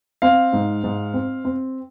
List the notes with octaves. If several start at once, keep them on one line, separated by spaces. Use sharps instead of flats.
C4 F5
G#2
G#2
C4
C4